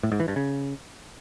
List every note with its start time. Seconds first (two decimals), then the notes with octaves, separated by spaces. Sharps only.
0.03 A2
0.12 G#2
0.20 E3
0.28 G2
0.36 C#3